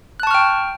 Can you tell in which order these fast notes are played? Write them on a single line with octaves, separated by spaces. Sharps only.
F#6 A5 C#6 F6 G5